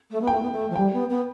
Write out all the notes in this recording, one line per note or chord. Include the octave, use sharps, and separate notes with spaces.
A3
B3
A3 G5
B3
A3
F3
G3 G5
B3
B3